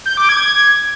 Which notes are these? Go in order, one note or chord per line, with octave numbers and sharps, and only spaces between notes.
G6
D6
G#6